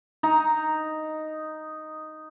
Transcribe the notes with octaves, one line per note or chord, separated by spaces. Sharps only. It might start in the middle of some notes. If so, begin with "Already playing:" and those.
D#4 A#5